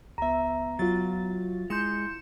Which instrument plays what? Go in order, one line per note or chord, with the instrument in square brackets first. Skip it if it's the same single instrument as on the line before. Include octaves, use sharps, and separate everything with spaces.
[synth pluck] C#2 E5 [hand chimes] B3 A#5
[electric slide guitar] F#3 [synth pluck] F4 A6
[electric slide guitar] G#3 [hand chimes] E4 C6 G6 [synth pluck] C#7 E7